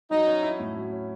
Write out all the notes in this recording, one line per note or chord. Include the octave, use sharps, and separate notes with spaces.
F#3 D#4
C#4
E4
A2
F#3
C#4